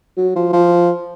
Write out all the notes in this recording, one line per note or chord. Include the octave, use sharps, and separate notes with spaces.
F#3
F3
F3